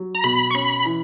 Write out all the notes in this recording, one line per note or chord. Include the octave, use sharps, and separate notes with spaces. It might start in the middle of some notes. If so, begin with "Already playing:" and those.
Already playing: F#3
A#5
B2 B5
C#6
C#4 B5
E3